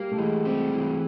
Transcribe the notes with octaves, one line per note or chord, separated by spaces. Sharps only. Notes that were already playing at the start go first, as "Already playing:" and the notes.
Already playing: G3 A#3
A3
E3 G#3
G3 C4
E3